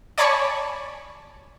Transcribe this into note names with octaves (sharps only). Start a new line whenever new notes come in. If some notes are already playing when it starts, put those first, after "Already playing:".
C#5 D5 G#5 A5 B5 C#6